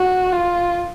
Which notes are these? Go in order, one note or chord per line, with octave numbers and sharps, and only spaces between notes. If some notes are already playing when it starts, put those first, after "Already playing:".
Already playing: F#4
F4